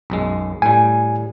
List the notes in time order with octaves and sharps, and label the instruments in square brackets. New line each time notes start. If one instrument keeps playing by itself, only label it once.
[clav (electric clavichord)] B1 F#2 G#3
[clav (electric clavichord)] A2 G3 [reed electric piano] G#5